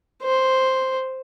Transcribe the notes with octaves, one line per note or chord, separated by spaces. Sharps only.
C5